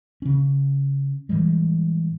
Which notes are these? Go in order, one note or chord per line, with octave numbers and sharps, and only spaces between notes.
C#3 C#4
A2 E3 G3 G#3